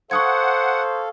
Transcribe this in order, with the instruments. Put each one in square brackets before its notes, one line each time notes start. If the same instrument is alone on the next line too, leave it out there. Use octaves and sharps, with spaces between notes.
[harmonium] A4 F5 [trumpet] C5 [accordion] F#5 [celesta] C#6 D#6 G#6